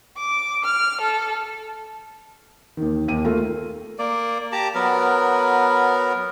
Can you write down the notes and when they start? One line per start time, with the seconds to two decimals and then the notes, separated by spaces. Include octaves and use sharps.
0.19 D6
0.63 F6
1.01 A4
2.77 D#2 D#3
3.08 D#2 D#7
3.25 A3 F4 A#4
3.99 A#3 D5
4.52 G4 A5 A#5 D6
4.75 F#3 B3 A#4